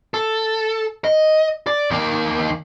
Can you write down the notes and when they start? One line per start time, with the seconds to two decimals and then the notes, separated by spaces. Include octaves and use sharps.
0.14 A4
1.05 D#5
1.67 D5
1.90 D#2 A#3